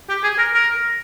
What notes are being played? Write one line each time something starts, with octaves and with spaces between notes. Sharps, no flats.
G4
G#4
A#4
A#4